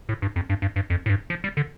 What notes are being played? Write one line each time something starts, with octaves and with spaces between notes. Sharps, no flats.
A2
G2
F2
G2
G2
G2
F2
A2
G2
F3
G3
D3